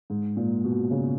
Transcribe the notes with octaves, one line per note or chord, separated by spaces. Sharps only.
G#2
A#2
B2
C#3